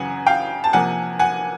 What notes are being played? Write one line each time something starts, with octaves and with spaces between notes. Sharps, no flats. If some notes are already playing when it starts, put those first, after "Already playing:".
Already playing: F#2 C#3 E3 F#5 G#5
F5 G5
A5
C3 F3 A#3 F#5 G#5
F#5 G#5